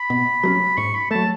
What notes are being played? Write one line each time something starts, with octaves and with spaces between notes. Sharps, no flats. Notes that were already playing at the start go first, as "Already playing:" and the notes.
Already playing: B5
B2
F#3 A3 C#4
G#2 C#6
B5
F#3 A3 A5